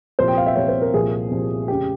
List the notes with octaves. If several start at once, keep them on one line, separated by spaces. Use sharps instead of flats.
C2 A#2 F3 C5
G5
F5
E5
C2 A#2 F3 C#5
C5
A#4
C2 A#2 F3 G#4
C2 A#2 F3
F1 C#3 G4